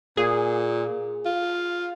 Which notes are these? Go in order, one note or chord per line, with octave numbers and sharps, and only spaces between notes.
A#2 G#4
F4